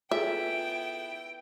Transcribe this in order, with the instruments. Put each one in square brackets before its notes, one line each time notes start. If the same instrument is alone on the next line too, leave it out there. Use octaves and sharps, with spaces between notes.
[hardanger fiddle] B3 E4 [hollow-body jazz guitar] F4 G#4 A4 [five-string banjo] E5 [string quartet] G5